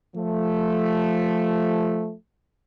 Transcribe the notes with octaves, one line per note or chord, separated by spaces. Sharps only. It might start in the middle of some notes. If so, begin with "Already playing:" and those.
F3 A3